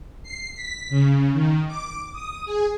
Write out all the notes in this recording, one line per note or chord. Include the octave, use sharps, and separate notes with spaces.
C7
B6
C#3
D#3
D6
D#6
G#4